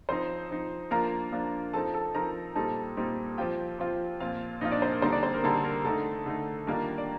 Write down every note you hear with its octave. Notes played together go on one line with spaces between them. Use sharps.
F3 C4 D#4 C5 C6
F3 C4 D#4
F3 A#3 D4 F4 A#4 A#5
F3 A#3 D4 F4
F3 C4 D#4 A4 A5
A4 A5
F3 C4 D#4 A#4 A#5
A#2 G3 C4 D#4 A4 A5
A#2 G3 C4 D#4
F3 C4 F4 G4 G5
F3 C4 F4
A#2 F3 C4 F4 F5
A#2 F3 C4 D#4 F4 D#5
D4 D5
C4 C5
A#4
D3 G3 A#3 C4 D#4 C5
D4 D5
C4 C5
A#4
D3 G3 A#3 D#4 A4
A#4
D3 A3 D#4 A4
D3 A3 D#4
D#3 G3 A#3 D4 F4 A#4
D5